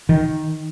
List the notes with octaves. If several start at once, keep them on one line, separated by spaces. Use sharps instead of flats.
D#3